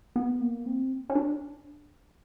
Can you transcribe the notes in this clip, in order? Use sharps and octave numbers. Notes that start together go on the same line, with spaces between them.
B3
A#3
C4
C#4
D4